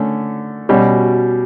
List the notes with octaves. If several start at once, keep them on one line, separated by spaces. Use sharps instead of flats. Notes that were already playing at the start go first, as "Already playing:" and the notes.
Already playing: D3 A3 C#4
B2 G3 C#4